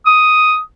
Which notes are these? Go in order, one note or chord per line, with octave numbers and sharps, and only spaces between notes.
D#6